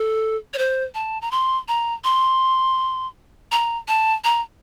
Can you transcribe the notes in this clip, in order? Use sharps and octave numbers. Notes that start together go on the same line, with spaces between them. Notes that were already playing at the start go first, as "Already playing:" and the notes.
Already playing: A4
C#5
C5
A5
A#5
C6
A#5
C6
A#5
A5
A#5